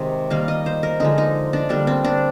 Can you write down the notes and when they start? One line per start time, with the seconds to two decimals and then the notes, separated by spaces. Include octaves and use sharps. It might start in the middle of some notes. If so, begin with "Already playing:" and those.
Already playing: C3 D#3 G#3
0.30 D#3 G3 A#3 F5
0.48 D#5
0.66 C5
0.83 A#4
1.00 D3 F3 G#3 D#4
1.18 D#4
1.53 D4
1.69 D3 G3 A#3 D4
1.87 C4
2.04 D4